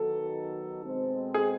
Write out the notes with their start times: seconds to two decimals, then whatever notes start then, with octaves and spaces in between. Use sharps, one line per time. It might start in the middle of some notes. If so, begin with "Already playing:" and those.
Already playing: D#3 F#3 B3 D#4 F#4 A4
0.84 B2 G#3 C4
1.34 G#4